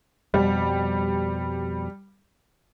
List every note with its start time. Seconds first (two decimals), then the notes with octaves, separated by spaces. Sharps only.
0.34 F2 B2 G3